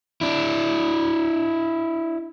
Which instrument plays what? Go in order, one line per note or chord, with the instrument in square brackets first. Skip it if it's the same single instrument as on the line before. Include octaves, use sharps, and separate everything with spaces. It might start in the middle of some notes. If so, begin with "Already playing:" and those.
[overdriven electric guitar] D4 E4